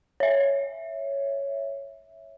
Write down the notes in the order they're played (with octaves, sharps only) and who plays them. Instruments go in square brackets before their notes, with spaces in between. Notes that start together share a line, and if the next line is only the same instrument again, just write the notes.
[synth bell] C#5 E5